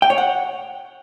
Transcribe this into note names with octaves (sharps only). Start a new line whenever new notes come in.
G5
C#5
F#5